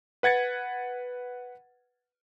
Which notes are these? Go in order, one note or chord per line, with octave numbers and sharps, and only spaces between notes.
B4 F#5 G#6 A6 C#7